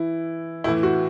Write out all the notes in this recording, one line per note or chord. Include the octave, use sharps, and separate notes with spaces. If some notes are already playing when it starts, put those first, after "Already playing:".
Already playing: E3 E4
A2 E3 E4
F#4